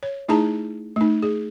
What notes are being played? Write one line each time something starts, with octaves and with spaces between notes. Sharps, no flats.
C#5
A3 D#4 E4 G#4 A5 A#5
A3 D#4
G#4